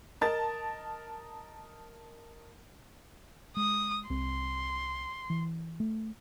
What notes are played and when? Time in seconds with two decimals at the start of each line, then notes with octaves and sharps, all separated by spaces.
0.21 A#4 D#5 A5 A6
3.57 G#3 D#6
4.10 C2 C4 C6
5.30 E3
5.80 A3